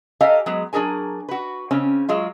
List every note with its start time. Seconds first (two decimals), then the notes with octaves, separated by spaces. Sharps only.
0.21 G4 A4 D#5 F5 G#5 A#5
0.46 F#3 G#3 B3
0.73 F#3 D4 G#4 A#4 G#5
1.29 F#4 B4
1.71 C#3 C4 C#4
2.09 F#3 G#3 F4